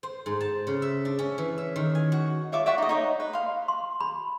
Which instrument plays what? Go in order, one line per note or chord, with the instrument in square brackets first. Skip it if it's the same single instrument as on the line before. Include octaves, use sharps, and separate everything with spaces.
[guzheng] C5
G#2
A5
C#3
E5
D4
C#4
E3
E5
D#3
G#5
F#4
[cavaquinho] F4 C#5 E5 D6
D5 E5 F#5 C#6
D#4 D#5
D#4 C#5 D#5
B4
F5 C6
[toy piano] C6
B5